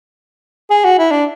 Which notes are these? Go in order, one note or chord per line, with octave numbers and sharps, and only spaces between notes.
G#4
F#4
E4
D4